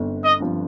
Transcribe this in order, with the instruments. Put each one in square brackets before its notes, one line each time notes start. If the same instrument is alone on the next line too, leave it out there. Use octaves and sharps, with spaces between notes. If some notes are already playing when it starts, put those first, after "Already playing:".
Already playing: [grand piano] G1 G2 C4
[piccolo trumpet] D#5
[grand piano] G2 F3 C4